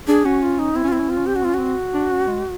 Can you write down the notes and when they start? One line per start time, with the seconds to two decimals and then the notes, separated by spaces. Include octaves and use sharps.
0.08 D4 G#4
0.25 C#4 F#4
0.42 F4
0.59 D#4
0.75 C4 E4
0.84 C#4
0.88 F4
0.93 C4 E4
1.00 C#4
1.09 C4 F4
1.18 C#4
1.26 C4 G4
1.34 C#4 F#4
1.43 C4 F4
1.50 C#4
1.54 C4 F#4
1.94 D4
2.10 C#4
2.27 G#3